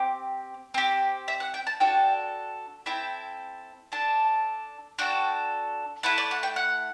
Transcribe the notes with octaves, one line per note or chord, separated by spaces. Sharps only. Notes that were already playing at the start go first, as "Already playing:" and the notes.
Already playing: C4 G4
C4 G4
E5
F#5
G5
A5
D4 F#4 A4 G5
C4 E4 A4 G5
D4 A4 A5
D4 F#4 A4 G5
A3 E4 A4 F#5
D5
F#5
G5
F#5